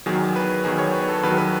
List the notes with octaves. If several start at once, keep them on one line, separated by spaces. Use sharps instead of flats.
E2 D#3 F#3 G#4
B4
E2 D#3 F#3 G#4
C#5
B4
A4
E2 D#3 F#3 B4
B4